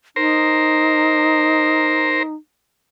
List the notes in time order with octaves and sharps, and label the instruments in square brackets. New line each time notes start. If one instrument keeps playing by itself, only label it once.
[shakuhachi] D#4 [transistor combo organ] A#4 C5